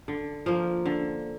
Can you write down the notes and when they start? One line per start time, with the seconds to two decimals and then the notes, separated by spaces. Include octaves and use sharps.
0.08 D3
0.46 F3 A#3
0.86 D3